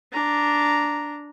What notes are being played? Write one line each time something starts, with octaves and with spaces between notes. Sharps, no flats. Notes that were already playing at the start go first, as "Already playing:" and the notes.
D4 A#5